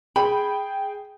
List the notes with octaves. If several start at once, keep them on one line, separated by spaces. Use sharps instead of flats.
G#4 G5 B5